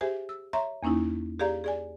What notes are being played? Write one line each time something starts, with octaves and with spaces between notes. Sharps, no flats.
G4 G#4 C5 E5 G#5
E6
C#5 E5 A#5 C6 C#6
E2 A#3 C#4 D#4 E4
G4 G#4 D5 F5 A#5
G#4 D5 G#5